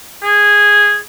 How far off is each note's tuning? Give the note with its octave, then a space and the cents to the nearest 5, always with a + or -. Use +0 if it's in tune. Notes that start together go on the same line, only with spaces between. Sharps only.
G#4 -10